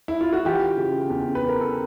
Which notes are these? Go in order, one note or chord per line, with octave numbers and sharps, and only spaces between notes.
E4
F4
F#4
E3 F4 G4
C#3
E2
B4
E2
A#4
A4